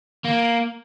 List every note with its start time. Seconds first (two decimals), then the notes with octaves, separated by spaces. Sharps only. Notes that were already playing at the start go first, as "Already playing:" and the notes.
0.24 A#3